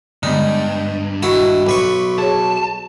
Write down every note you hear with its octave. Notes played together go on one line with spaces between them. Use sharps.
G2 D3 G#3 B3 D#4
D#3 E4 F#4
B1 B4 C#6
G#4 C#5 A5